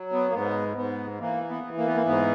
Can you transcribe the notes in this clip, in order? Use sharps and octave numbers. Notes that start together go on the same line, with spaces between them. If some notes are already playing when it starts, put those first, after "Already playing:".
Already playing: F#3
B3
A#3
G#2 B3
G#2 B3
E3 A#3
B3
E3
A#3
B3
A#3
G#2 B3